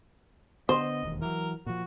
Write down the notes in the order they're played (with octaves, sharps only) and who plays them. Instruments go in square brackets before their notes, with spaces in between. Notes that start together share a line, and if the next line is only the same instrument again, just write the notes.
[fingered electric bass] D3 B3 [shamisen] C5 [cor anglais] D#5
[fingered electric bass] E1 D#2
[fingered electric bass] E3 F#3 [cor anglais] A#4
[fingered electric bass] A#2 F3 [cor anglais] F#4